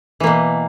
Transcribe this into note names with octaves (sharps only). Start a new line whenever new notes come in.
B2 E3 A#3